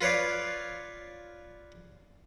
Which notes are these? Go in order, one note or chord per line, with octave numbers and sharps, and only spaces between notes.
F4 B4 C#5 D5 F5